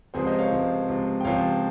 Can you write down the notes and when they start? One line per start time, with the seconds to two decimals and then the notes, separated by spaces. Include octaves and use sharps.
0.14 C#2 C3 F3 G#4 C5
0.26 C5 D#5
0.39 C#5 F5
0.51 C#2 C3 F3
0.88 C#2 C3 F3
1.21 G5
1.24 C#2 C3 F3 C#5 F5